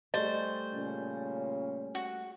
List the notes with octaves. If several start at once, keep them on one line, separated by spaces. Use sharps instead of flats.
G3 A3 G#4 C5 D#5
A#2 C#3 C#4
F#4